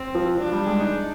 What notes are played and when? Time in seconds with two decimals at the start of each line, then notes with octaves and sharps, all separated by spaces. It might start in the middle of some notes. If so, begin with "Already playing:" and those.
Already playing: C4
0.15 F3
0.38 F3 D4
0.52 G3
0.67 G#3
0.80 D#4